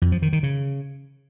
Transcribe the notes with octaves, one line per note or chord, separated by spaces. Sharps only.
F2
F3
D#3
D#3
C#3